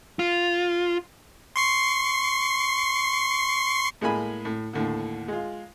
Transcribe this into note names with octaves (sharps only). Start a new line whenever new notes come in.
F4
C6 C#6 C7
A2 G#3 A#3 G#5 B5
A2
D#2 A2 D3
G#3 F4